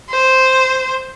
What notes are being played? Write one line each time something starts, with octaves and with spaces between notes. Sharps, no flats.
C5